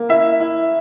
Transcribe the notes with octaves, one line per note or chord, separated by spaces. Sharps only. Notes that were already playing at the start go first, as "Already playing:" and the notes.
Already playing: A#3
E4 E5
E4